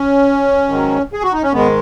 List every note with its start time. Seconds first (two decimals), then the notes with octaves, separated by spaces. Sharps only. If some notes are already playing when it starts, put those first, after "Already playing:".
Already playing: C#4
0.69 G#2 D#3 F#3
1.13 G#4
1.23 F#4
1.33 D#4
1.43 C#4
1.52 G#2 D#3 G#3 B3